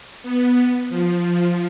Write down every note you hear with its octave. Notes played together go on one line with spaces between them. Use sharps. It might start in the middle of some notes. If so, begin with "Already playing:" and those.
B3
F3